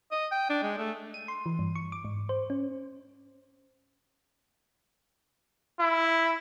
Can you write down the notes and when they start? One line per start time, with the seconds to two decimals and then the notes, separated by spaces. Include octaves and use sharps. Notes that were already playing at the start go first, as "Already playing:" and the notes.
0.12 D#5
0.32 G5
0.50 D4
0.63 G#3
0.78 A3
1.14 D#7
1.28 C6
1.46 E3
1.59 G2
1.75 C#6
1.92 D6
2.04 G#2
2.29 C5
2.50 C#4
5.80 E4